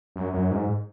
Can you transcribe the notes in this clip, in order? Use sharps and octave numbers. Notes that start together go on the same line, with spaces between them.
F#2
F#2
G#2